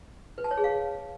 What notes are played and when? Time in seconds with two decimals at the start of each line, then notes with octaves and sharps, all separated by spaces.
0.38 B4
0.44 A5
0.51 C#5
0.57 G#4
0.64 F5